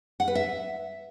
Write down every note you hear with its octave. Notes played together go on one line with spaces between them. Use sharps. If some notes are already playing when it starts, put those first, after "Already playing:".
F#5
B4
E5